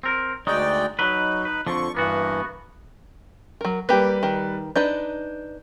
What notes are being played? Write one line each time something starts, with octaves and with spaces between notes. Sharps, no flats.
C4 A#4
D2 G#3 D#4 F#4 D5 G5
F#3 D#4 B4
B4
F2 D3 F3 C#6
G2 E3 A#3 B3 F#4
F#3 A#4
G3 A#3 G4 B4
D#3
D4 D#4 B4 G6